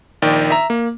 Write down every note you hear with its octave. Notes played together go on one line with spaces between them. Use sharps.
A#1 D#3 D5 G5
E5 A#5
A#3